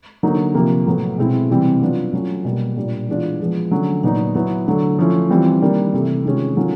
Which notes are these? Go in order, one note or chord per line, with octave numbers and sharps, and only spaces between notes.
D3 F#3 A#3 D#4
C3 F3 A#3
A2 F#3 B3
B2 G#3 C4 E4
C3 E3 G3 C4
F#3 B3 D4 F4
F#3 A3 C#4 F4
B2 G3 A#3
A#2 G3 A#3 D4 F4
E3 G#3 B3 D4 F4
F3 G#3 B3
D3 F#3 A3 C#4
A#2 F#3 B3 D#4
F#3 B3 E4
D3 F#3 A3
F3 A3 C#4 E4
E3 G3 C4 F4
D#3 G3 A#3 D4
C3 E3 A3
C3 D#3 G#3 C#4 F4
D#3 F#3 A3 C#4 F4